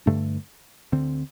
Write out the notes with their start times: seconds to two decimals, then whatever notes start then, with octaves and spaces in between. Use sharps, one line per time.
0.06 G2 D3 A3 D4
0.92 D2 D3 C4